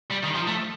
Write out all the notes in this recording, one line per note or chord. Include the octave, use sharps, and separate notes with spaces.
G3
D#3
F3
A3